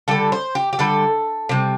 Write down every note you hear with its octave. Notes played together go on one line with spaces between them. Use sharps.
D3 G3 A4
C5
G4
G4
D3 G3 A4
C3 G3